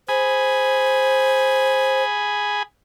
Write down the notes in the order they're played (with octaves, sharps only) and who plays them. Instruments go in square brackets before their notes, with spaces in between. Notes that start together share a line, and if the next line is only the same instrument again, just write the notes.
[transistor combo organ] G#4 G#5 B5 [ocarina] C5